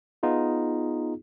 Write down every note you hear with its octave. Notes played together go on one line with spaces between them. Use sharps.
B3 D#4 F4 G#4